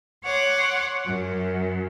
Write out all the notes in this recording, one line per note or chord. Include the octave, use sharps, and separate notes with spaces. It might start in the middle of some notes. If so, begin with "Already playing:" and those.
C#5 F#5 C6 D6
F#2